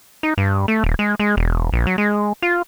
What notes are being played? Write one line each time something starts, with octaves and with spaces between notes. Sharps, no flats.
D#4
G2
A3
D#1
G#3
G#3
E1
A#1
F#3
G#3
F4